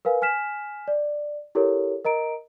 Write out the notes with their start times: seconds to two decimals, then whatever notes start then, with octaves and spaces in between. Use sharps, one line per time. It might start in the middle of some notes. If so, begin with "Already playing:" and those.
0.05 A#4 B4 F5 G#5
0.22 G#5 F6 B6 E7
0.88 D5
1.55 E4 G4 A4 A#4 C#5
2.04 A#4 D#5 A#5 D7